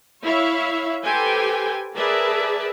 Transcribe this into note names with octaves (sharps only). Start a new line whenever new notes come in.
E4 C#5 E5 F5
G4 A4 B4 C5 G5 G#5
G#4 A#4 B4 D5 E5 A5